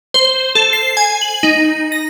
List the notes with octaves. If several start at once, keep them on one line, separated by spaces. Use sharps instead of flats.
C5
A4
C7
G#5
F#7
D#4
A#6